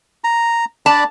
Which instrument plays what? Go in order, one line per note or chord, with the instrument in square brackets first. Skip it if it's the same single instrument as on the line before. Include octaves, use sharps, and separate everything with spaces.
[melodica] A#5
[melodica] D4 D5 B5 [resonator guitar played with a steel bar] A5